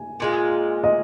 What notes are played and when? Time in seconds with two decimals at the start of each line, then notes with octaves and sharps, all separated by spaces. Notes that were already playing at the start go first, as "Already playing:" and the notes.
Already playing: G#5
0.20 A#2 G#3 F4
0.84 D#5